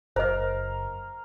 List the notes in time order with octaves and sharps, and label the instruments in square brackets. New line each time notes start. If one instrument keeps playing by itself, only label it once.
[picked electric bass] F#1 [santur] A#4 F5 [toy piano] C5 D#5